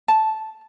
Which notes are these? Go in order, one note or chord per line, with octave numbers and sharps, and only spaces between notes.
A5